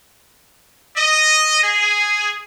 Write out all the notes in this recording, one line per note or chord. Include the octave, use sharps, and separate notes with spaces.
D#5
G#4